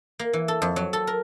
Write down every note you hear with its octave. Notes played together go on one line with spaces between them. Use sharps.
A#3
E3
A4
F2
F#3
A4
A#4